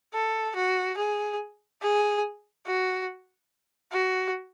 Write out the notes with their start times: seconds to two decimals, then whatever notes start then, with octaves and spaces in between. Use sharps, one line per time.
0.14 A4
0.56 F#4
0.98 G#4
1.82 G#4
2.66 F#4
3.92 F#4